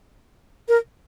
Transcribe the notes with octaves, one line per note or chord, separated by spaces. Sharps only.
A#4